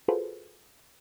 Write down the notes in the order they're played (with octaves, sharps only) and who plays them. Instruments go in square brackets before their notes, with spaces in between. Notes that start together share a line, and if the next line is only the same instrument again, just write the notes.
[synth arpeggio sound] F4 F#4 G#4 A4 B4 C5